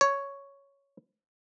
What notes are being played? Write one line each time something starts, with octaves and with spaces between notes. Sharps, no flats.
C#5